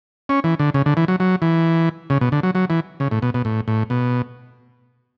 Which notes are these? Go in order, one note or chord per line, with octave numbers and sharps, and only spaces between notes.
C#4
E3
D3
C#3
D3
E3
F#3
F#3
E3
C#3
B2
D3
F#3
F#3
E3
C#3
A2
B2
B2
A2
A2
B2